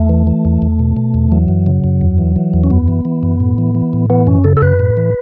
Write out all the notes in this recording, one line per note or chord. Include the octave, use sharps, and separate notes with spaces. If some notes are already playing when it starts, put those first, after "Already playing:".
Already playing: E2 A3
E3
E3
E2
E2
B2
B2
E2
E3 F#3
F#2
C#3
F#2
E2
E3
E3
E2
C#4
F#2 B3
E3
E3
F#2
A2
E3
E3
A2
E3 B3
F#2 C#4
C#3 A4
A4
F#2 B4
A2
E3